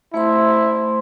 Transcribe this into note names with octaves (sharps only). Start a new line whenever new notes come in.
A3 E4 C5 C6